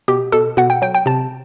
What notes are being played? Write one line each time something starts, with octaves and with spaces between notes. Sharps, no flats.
B2 G4
B2 A4
B2 F#5
G5
F#3 G5
G5
C3 A5